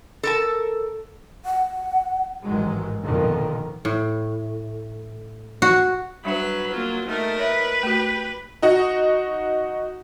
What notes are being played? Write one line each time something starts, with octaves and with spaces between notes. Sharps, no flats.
A4 A#4 A5
F#5
A1 G#2 D#3 F#3 G#3
A#1 F2 B2 D3 D#3 F3
A2
F#4
F#3 G3 D4 B4 F#5 B5
A#3 F4
A3 D#4 A#4
B4 C#5 E5
A3 F#4 G4
D#4 F#4